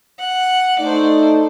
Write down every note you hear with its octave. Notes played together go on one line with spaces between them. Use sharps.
F#5
A3 D#4 C5 D5